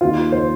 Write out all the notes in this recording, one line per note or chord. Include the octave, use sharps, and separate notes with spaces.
D#2 D#3 F4
C5